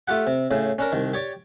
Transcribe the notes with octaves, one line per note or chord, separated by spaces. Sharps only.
A3 F4 G4 F#5
C3
A2 C#3
C#4 D4 A#4
C2 D#3
G4 C#5 D5